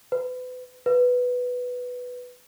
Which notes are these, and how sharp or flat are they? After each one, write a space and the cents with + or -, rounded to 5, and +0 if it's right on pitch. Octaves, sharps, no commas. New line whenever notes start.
B4 +35
B4 +0